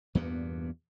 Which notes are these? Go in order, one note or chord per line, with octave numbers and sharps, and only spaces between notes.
E2 G2 A#2 B3